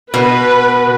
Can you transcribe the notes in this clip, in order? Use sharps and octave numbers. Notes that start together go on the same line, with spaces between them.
B2 B4